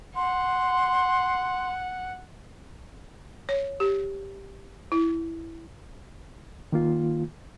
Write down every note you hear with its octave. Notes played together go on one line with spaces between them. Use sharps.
F#5 C6
C#5
G4
E4
D#3 A#3 F4